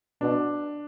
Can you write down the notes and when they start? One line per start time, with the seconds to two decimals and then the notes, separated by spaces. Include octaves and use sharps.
0.21 B2 D4